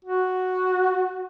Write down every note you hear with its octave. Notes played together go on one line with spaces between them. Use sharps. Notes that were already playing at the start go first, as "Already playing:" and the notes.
F#4